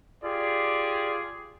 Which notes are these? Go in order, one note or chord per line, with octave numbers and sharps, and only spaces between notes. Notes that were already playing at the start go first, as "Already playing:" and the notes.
F4 G4 G#4 D5